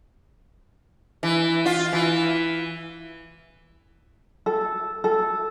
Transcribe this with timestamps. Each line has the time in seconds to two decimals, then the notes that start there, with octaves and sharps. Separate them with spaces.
1.23 E3
1.66 F4
1.93 E3
4.46 A4
5.04 A4